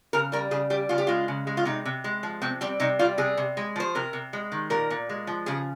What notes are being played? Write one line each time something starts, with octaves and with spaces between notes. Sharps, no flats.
C#3 A#4
G3 A#4
C#3 G#4
G3 G4
C#3 F4
G4
G#3 F4
C#3
G#3
F4
C3 D#4
C3
G#3
F3
C3 C4
G3 C4
C3 D#4
G3 F4
C3 G#4
C3
G#3
F3 C5
C3 A#4
C3
G#3
D#3
A#2 A#4
A#2
G#3
F3
C#3 G#4